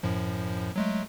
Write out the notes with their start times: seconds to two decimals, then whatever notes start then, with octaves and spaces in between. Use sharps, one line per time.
0.03 F#2 A2 F3
0.76 F#3 G#3 A3